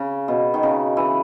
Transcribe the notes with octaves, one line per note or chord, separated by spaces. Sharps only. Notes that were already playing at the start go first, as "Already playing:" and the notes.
Already playing: C#3
B2
D#3
C#3
E3